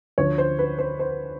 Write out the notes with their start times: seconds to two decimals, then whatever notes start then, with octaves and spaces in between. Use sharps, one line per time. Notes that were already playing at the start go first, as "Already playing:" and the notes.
0.18 D2 D3 F3 C#5
0.38 C5
0.59 B4
0.79 C5
0.99 C5